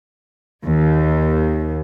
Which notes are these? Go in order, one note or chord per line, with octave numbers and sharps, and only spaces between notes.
D#2